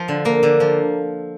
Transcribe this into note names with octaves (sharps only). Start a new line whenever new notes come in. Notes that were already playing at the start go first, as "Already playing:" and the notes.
Already playing: F3
D3
A#3
D3
F3